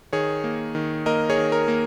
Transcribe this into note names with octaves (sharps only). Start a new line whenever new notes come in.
D#3 G#4 C#5
A#3
D#3
A#3 A#4 D#5
G#4 C#5
D#3
A#4
A#3